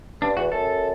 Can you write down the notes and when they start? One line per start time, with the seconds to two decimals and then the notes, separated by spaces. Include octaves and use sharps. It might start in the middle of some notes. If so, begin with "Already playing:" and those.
0.22 G2 D4
0.36 E2 F#4
0.51 F#2 A4